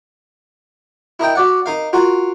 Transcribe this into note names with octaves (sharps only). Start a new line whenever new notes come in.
E4 A#4 D#5 G5
F#4 D5 F#5
D#4 A#4 F5
F4 F#4 A#4